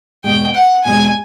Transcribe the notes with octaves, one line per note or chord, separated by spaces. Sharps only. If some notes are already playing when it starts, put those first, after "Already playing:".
E2 B2 G#3 G5
F#5
E2 B2 G#3 G#5